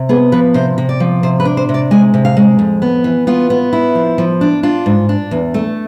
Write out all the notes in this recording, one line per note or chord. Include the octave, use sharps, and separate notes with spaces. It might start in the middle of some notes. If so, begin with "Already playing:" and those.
Already playing: C3
B3 G#4
F3 B4
C3 C5
C3
D5
F3
C3 C5
B4
D4
C5
C3
D5
G#3 G#5
C3
F5
G#3
F2
B3
E3
B3 F4
B3
E4
F3
F3
D4
D4 F4
G#2
D4
E2
A3